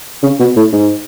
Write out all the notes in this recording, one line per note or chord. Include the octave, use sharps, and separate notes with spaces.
C#3
B2
A2
G#2